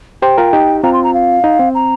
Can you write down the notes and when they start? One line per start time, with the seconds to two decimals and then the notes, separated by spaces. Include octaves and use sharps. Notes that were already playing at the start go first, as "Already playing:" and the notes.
0.22 G4 C5 G5
0.38 F4 A#4
0.53 D#4 G4
0.83 C4 F4 A#5
0.93 C6
1.04 A#5
1.14 F5
1.44 D#4
1.60 C4
1.75 A#5